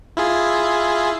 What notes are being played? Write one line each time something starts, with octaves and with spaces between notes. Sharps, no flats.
E4 F4 G#4